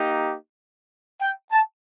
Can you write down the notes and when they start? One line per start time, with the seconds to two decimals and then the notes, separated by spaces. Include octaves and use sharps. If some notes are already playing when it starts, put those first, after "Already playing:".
Already playing: A#3 D#4 G4
1.21 G5
1.52 A5